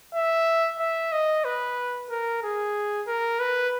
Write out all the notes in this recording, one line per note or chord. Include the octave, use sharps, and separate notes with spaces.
E5
E5
D#5
B4
A#4
G#4
A#4
B4